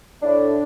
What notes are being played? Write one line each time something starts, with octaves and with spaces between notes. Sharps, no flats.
A2 D4